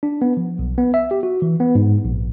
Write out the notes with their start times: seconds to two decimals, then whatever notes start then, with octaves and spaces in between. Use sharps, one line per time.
0.03 D4
0.22 B3
0.37 F3
0.59 B1
0.78 B3
0.94 E5
1.11 G4
1.23 F#4
1.42 E3
1.60 B3
1.75 G#2
2.05 A#1